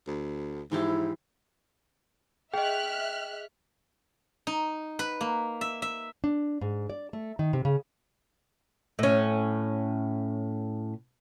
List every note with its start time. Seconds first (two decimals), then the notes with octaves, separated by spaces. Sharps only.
0.07 D2
0.71 G#2 E3 F3 E4 G4
2.54 G#4 D#5 E5 G5 F6 F#6
4.47 D#4
4.99 B4
5.21 A#3
5.61 E5
5.82 E5
6.24 D4
6.61 G#2
6.90 D5
7.13 A3
7.39 D#3
7.53 C3
7.65 C#3
8.99 A2 C#4